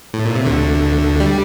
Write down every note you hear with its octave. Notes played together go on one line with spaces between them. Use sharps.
A2
A#2
C3
D2 D3
G3